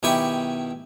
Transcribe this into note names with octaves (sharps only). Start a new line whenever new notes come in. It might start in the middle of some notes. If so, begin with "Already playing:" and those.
B1 D#3 E4 G4 G#5 C#6